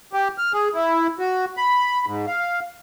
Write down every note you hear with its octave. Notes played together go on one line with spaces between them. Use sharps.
G4
F6
G#4
E4
F#4
B5
G#2
F5